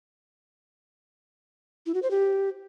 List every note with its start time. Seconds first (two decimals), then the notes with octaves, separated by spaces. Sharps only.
1.86 E4
1.94 F#4
2.02 C5
2.11 G4